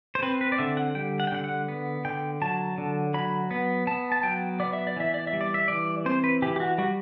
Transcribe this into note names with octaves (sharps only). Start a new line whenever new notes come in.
C5
C4 B4
B4
D5
D3 E5
F#5
G3 G5
F#5
G5
D3 F#5
F#5
B3
D3 G5
F#3 A5
D3
F#3 B5
B3
B3 A5
A5
F#3 G5
B3 D5
E5
D5
E3 E5
D5
E5
G3
D5
E5
E3 D5
C4 C5
B4
E3 G4
G4
F#4
G3 F#4